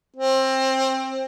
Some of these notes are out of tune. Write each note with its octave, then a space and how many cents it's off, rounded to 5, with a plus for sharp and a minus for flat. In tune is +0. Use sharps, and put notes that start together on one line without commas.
C4 +20